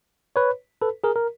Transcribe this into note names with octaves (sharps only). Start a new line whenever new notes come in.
B4 C#5
A4 B4
G#4 A#4
A#4